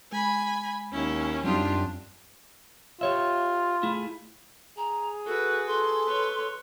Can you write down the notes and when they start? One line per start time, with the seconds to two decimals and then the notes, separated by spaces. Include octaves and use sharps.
0.12 G#3 G#5 B5
0.92 D#2 C#4 E4
1.44 F#2 G3 C4 D4 D#4 F4 G4
3.01 F4 G4 C#5 E5
3.83 A3 E4 G#4
4.78 G#4 A#5
5.26 F#4 A4 B4
5.67 A4 C6
6.04 B4 C#5